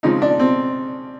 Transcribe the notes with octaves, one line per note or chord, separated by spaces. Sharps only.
C#3 F3 G#3 C4 D#4
D4
C4